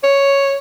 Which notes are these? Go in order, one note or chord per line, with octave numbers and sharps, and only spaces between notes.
C#5